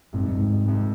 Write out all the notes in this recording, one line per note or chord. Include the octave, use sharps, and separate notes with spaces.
F1 F2 A2 C3
G#2
G2
G#2
F1 F2 C3